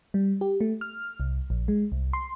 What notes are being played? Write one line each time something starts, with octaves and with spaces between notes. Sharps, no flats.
G3
G4
A3
F6
C2
A#1
G#3
C2
C6